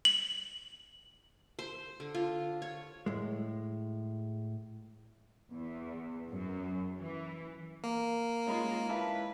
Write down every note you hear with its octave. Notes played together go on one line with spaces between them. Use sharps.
F#7
C5
D3
F4
C#5
A2 G#3
E2
F#2
E3
A#3
G#3 C#4 D#4 F4 A#4 B5
E4 B4 F5 A5